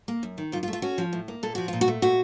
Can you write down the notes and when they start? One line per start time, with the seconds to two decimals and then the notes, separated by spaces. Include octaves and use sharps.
0.08 A#3
0.23 F#2
0.38 D#3
0.52 F#2 F4
0.63 F4
0.68 A3
0.73 F4
0.82 C#4 F#4
0.98 F3
1.13 A2
1.28 A#3
1.43 A#2 A4
1.55 F3 F#4
1.68 A#2 F4
1.81 F#4
1.88 A3
2.02 A#2 F#4